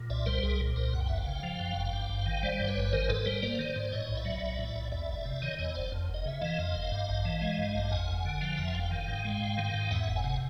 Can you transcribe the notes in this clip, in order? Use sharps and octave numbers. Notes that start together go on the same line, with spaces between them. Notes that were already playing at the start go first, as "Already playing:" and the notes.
Already playing: A#2
C2 D5 E5
G3 A#4 C5
C2 G#4 A#4
A#2
C2 A#4 C5
F#2 F#5
G5
G1 E5 F#5
F5 G5
C#3
F3
F#2
G1
G2
G#1
D#3
G3 C5 D5
G2
B4 C#5
G#1
D#3 A#4 C5
G#2 A4 B4
G3 A#4 C5
A#3 C5 D5
D#3
G#2
A2 C#5 D#5
B1
D5 E5
F#3
B1
A2
B1
E2 D5 E5
F#1
C3
D#3 C#5 D#5
E2 C#5 D#5
F#1 C5 D5
F2
F#1
D#5
C#3 E5
E3 D#5 F5
F2
F#1
G2
A1
E3
G#3
G2
A1
F2 F#5 G#5
F#1
D3
F3 F5 G5
F2 E5 F#5
G#5
F#1 F5 G5
D#3
G#2
G#3
G#2
D#3
G#2
E2 E5 F#5
F#1
F#5 G#5
C3